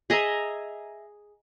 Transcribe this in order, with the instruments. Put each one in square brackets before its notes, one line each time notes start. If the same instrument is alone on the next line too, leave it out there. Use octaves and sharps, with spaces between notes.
[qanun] G#4 D#5 E5 A#5